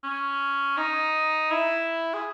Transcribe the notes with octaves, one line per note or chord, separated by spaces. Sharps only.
C#4
D#4
E4
G#4